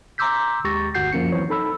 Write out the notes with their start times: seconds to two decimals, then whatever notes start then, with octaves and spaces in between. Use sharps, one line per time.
0.18 A#5 C6 D6 E6 G6 B6
0.64 D#2 G#3 G4 C#6 A6 A#6
0.94 G1 D2 F#4 F#5 G6 C7
1.12 F#2 F3 A#3 C#4 C#7
1.32 E3 F#3 C4 C5 C#5
1.49 D#4 A4 B5 E6